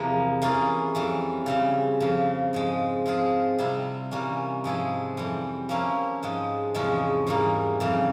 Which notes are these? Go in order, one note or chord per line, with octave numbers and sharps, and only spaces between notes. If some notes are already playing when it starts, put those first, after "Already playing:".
Already playing: E2 C3 F3 A#3
E3 A#3 C#4 F4 G#4
F2 E3 G3
C#3 G3 C4
F2 C#3 F3
G#2 F3 G#3
F3 C4 F4 G#4
C3 G3 C4 E4 G4
C3 E3 G3 A#3 C#4
G#2 F3 G#3 E4 G#4
F2 E3 G3
F3 A#3 C#4 E4 G4
G#2 F3 G#3
E2 C3 F3 G#3 C#4
G#2 E3 G3 A#3
F2 C#3 E3 G3